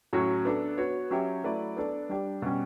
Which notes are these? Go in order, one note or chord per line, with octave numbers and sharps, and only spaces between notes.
A2 F#3 C#4 F#4 C#5
B3 D4 A4
B3 F#4 C#5
F#3 C#4 G4 C#5 E5
F#3 A3 E4 B4 D5
B3 D4 A4 D5
G3 D4 G4 D5
B2 G3 C#4